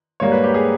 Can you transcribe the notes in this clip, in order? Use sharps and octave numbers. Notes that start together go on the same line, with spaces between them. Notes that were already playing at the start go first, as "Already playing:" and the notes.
G#2 G3 A#3 C#5
B4
G4
G#4